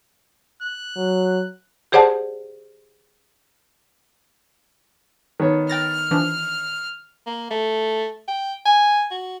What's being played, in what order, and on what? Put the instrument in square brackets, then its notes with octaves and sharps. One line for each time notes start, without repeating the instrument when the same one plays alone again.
[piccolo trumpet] F#6
[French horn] F#3
[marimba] G4 G#4 C5 D5 F#5 A5
[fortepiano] D#3 B3 C#5
[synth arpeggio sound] G5 A6 A#6 [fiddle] F6
[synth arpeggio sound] E3 F3 D4
[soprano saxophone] A#3
A3
G5
G#5
F#4